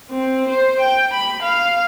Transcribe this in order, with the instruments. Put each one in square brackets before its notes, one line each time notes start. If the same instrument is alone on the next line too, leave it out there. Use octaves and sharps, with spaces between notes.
[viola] C4
C5
G5
B5
F5